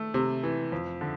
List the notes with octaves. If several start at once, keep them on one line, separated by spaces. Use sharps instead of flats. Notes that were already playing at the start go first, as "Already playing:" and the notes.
Already playing: A3
C3
E3
F2
D3